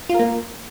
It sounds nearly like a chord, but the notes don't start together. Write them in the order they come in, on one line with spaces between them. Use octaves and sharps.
F4 A#4 A#3